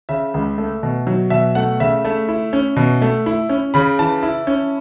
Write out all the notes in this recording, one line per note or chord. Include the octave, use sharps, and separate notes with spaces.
C#3 E5
C#2
A3
B2
F#3
B2 E5
A3 F#5
C#3 E5
A3
E4
C#4
B2
A3
E4
C#4
C#3 B5
E3 A5
E4
C#4